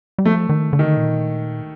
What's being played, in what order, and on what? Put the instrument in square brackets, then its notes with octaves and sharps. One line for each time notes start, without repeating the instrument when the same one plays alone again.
[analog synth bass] G3
[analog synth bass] F3 [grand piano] A3
[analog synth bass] D#3
D3
[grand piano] D#3
[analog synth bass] A#2